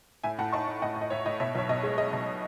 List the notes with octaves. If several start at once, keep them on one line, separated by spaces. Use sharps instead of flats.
A2 E5 G#5
A2 F#5 A5
D#4 A5 C#6
D#4
A2 D#5 F#5
A2
D#5
A2 C#5 E5
A2 D#5
B2 C#5 E5
B1 C#5
B2 D#5
G#3 C#5
G#3 D#5
B2